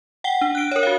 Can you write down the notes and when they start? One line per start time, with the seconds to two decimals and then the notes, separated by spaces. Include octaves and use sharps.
0.24 F#5 G5 G7
0.41 D4
0.55 F#6 D7
0.72 A#4 C#5
0.83 F#4 F5